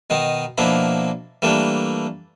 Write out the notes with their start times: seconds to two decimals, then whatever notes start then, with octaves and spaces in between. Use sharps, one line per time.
0.10 B2 D#3 D#4
0.58 B2 F3 A#3 D4 E4
1.42 E3 G3 A3 A#3 D4